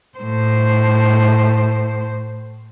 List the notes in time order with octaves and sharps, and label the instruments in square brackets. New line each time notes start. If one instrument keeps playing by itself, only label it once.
[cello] A2 C5